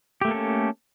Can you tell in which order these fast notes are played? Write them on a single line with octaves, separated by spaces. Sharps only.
G4 A3 A#3 A4 C#4